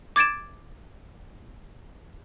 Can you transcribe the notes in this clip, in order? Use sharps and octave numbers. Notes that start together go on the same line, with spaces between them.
D6 G#6 A6 D7 E7